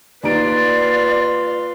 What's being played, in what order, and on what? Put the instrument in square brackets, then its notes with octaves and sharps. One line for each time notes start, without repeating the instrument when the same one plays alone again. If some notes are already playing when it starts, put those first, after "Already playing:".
[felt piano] D#2 D#4 D7 [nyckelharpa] F4 B4 [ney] D5